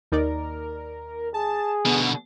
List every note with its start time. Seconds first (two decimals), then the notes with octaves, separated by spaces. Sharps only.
0.12 D#2 D#4 A#4 D5
1.34 G#4 A5
1.86 B2 D3 B3